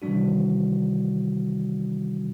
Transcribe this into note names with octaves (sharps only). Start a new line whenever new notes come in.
C3 D#3 E3 G3 D4 F#4